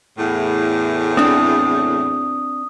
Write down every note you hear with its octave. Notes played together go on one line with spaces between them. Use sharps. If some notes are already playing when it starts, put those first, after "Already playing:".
E2 A2
C4 D4 D#6